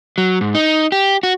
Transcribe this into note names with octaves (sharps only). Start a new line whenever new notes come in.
F#3
G#2
D#4
G4
F#4